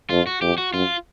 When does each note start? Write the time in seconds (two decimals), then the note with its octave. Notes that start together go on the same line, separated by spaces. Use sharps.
0.10 F2 F4
0.27 F#4
0.42 F2 G4
0.58 F#4
0.73 F#2 F4